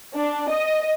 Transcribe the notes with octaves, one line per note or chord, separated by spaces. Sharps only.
D4
D#5